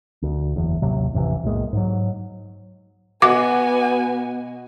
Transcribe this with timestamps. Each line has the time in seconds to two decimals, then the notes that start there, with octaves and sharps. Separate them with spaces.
0.22 D2
0.56 F#1 E2
0.82 A1 D#2 C3 F#3
1.13 A1 F2 C3 E3
1.44 B1 A2 G#3 A#3
1.73 G#2 F#3
3.22 B2 B3 F#4 D#5 F#5 G#5 D6